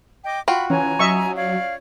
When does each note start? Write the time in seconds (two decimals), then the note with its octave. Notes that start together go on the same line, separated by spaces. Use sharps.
0.24 D#5 G5 D6
0.48 F4 F#4 G5 B5
0.70 E3 C#4 G#5 A#5
0.99 F#3 D#5 E5 C#6
1.36 C#5 D5 F5